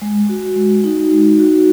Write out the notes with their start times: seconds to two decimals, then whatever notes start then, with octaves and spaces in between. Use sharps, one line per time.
0.02 G#3
0.29 F#4
0.56 G#3
0.84 D#4
1.12 G#3
1.39 F#4